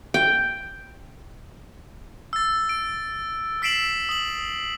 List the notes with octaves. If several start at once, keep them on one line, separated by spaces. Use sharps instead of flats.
G5
E6 A6
D7
E6 B6 C7 D7 E7 F#7
D#6 F#7